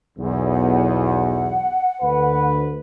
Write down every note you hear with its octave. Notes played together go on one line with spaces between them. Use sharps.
B1 E2
F#5
F#5
D2 B4